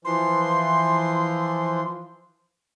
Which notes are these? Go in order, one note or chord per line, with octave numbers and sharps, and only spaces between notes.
E3 F3 C6